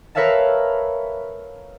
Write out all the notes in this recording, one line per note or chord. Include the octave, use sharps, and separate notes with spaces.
A#4 B4 C#5 E5 F5 A5